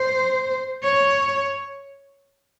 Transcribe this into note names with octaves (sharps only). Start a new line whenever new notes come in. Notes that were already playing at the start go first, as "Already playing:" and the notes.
Already playing: C5
C#5